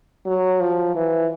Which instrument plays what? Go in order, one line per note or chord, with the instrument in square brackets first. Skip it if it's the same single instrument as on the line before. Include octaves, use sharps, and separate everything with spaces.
[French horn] F#3
F3
E3